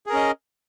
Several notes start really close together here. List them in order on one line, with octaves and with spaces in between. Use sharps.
G#4 A#4 C#4 D#5